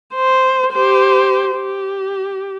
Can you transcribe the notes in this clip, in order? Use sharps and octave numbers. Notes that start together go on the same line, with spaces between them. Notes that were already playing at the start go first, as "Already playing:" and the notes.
C5
G4 C5
G4